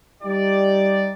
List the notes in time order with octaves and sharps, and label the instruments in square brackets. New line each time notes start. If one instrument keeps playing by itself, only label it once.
[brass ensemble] G3 D#4 G4 D5